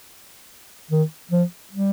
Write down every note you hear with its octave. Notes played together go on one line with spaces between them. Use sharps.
D#3
F3
G3